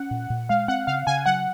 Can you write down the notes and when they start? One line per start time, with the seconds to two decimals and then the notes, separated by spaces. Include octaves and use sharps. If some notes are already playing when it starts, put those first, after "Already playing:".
Already playing: C#4 F#5
0.11 A#2
0.30 A#2
0.49 G#3 F5
0.68 C4 F#5
0.87 C#3 F5
1.07 C#3 G#5
1.26 F#3 F#5